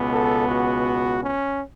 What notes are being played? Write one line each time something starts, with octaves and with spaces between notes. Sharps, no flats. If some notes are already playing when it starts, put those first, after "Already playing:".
Already playing: C#2 B2 B3
A4
F#4
C#4